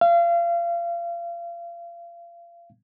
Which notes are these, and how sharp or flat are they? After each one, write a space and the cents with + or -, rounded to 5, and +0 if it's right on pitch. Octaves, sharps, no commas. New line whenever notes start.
F5 -30